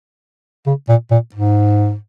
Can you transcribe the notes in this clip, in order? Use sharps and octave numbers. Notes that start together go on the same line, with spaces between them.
C#3
A#2
A#2
G#2